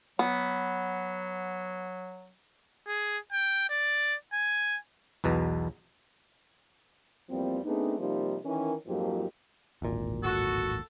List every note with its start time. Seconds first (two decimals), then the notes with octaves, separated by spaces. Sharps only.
0.19 F#3 B3
2.87 G#4
3.32 G5
3.69 D5
4.33 G#5
5.24 B1 E2 B2
7.29 E2 F3 G3 A#3 C4
7.65 A3 B3 C4 D4 D#4 G#4
7.99 C3 F3 G3 A#3 D#4
8.44 D#3 E3 C#4 A#4
8.86 F2 G#2 F3 F#3 A#3 G4
9.82 D1 G#1 A#2
10.23 F#4 A4